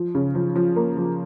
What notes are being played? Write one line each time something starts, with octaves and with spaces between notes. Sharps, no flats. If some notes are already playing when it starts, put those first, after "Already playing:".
Already playing: F3
C#3
F3
F3
A#3
F3